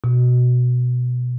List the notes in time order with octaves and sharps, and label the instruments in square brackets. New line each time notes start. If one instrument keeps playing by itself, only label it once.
[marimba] B2